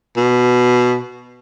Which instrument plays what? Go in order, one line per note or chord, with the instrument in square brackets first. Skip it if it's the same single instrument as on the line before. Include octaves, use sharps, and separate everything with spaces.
[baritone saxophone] B2